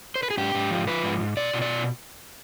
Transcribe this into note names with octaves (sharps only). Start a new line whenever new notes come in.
C5
B4
G#4
G#2 G4
G#2
F3
F3 B4
G#2
G#2
B2 D5
B2
D5